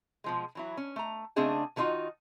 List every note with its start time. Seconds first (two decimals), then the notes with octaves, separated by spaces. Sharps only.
0.24 B2 F3 G#3
0.55 E3 F#3 E4
0.77 C#4
0.96 A3 A#5
1.36 C#3 A3 C4 D4 G#4 D#5
1.76 D#3 F#3 A#3 D#4 F4 F#4